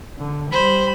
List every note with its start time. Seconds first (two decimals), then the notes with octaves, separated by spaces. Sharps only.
0.19 D3
0.52 G3 C5 B5